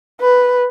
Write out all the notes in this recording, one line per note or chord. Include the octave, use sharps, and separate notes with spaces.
B4